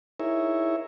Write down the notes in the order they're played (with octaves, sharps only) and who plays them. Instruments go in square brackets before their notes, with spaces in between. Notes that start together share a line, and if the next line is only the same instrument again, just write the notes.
[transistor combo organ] D#4 E4 G#4 A#4 C#5 E5